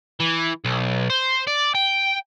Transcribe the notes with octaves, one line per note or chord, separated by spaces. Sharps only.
E3
B1
C5
D5
G5